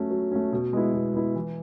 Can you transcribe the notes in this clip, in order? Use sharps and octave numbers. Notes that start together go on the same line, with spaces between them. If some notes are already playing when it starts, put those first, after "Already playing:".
Already playing: F#3 A3 C#4
F#3
A3 C#4
B2
G#3 B3 E4
B2
G#3 B3 E4
E3